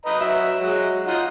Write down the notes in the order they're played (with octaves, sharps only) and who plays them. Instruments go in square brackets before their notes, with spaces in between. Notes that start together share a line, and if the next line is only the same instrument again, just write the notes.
[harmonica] B4 D#5 A#5
F#3 E5
F#3 G#3
D#4 F4 F#5